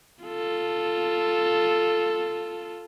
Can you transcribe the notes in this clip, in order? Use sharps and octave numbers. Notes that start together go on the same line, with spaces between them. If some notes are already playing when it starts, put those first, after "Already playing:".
F4 A4